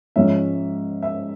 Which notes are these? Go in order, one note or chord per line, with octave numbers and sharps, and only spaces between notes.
G#2 F3 G#3 C#4 E5
E5